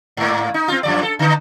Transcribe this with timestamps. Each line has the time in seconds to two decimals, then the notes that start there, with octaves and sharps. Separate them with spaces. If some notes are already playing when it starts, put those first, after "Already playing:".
0.17 G#2 A#3
0.54 D#4
0.68 C4 F4
0.83 F#2 F3 D5
1.03 A4
1.19 D3 D#4